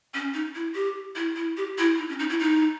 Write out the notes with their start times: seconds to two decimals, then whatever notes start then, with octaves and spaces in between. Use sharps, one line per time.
0.14 C#4
0.34 D#4
0.55 E4
0.75 G4
1.16 E4
1.36 E4
1.57 G4
1.78 E4
1.98 D#4
2.09 C#4
2.19 D#4
2.30 E4
2.40 D#4